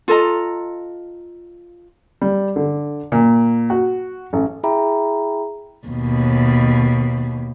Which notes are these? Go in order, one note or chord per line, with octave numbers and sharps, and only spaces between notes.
F4 A4 D#5 A#5
G3
D3
A#2
F#4
A1
E4 G#4 E5 G5 A#5 B5
D#2 B2